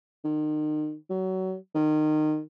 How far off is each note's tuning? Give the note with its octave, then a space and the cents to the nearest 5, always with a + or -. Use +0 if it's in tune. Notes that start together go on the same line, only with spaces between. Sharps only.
D#3 -35
F#3 +25
D#3 -25